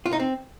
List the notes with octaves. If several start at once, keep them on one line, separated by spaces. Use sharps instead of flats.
F4
D#4
C4